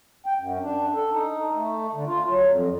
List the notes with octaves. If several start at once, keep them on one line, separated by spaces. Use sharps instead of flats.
G5
F#2
D4
A4
D#4
A3
D3
F4
F#3
F2